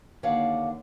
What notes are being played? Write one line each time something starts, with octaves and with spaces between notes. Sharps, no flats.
D#2 D3 C#5 D5 F5 F#5